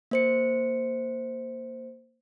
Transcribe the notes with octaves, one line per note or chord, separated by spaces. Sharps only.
A#3 C5 C#7